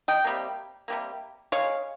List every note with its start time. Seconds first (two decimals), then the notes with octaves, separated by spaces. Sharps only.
0.08 D#5 G5
0.24 C3 G3 A#3
0.88 C3 G3 A#3
1.52 C#3 G#3 C#5 F5